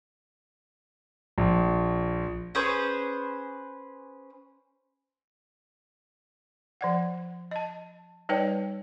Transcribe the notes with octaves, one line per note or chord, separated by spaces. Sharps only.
A#1
C#4 G#4 B4 C5
F3 D5 F#5
D#5 A5
G3 D#4 B4 C#5 D5 G5